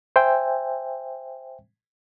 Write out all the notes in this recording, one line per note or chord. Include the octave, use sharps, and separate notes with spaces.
C5 E5 G5 G#5